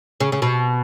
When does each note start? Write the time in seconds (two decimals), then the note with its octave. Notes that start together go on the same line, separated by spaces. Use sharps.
0.20 C#3
0.32 C#3
0.42 B2